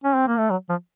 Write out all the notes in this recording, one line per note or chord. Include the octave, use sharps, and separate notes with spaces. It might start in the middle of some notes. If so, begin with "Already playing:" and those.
C#4
C4
A#3
A3
F#3
F3